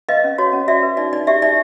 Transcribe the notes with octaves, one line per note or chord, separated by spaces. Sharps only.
B4 D#5 F5
C#4
F#4 C#5
C#4
F#4 D5 E5
B4
D#4 D5
D#4 D5
G4 D5 E5
D#4 D5 E5